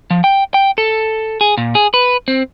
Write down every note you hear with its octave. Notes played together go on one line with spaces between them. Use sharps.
F3
G5
G5
A4
G#4
A#2
G#4
B4
C4